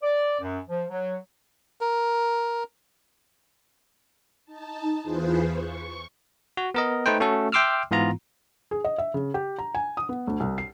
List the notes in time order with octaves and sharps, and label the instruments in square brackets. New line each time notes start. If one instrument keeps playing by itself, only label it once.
[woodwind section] D5
F#2
F3
F#3
[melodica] A#4
[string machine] D#4 A5
E2 E3 F4 G#4 B4 C5
C#6
[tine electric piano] F#4
B3 A#4 D#5
A3 D#4 B4 C5 G5
A3 C#4 F#4 A4
E5 G5 C6 D6 E6 F6
G#2 E3 B3 F4 A#5
[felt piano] G#4
D#5
E5
C#3
G4
A#5
G#5
D#6
B3
D2
C2
C7